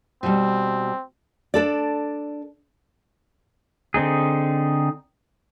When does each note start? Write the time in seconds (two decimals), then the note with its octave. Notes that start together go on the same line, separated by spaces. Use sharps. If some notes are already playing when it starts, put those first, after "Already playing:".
0.23 B2 G3 C4
1.54 D4 A4 D5
3.94 D3 C4 D#4 G#4